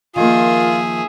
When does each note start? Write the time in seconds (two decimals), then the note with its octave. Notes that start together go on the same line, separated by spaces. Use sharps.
0.16 D#3 F3 A#3 F4 G#4 E5